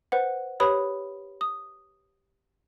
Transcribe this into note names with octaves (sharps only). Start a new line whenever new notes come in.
B4 C5 F#5
G4 B4 C#5 B5 D#6
D#6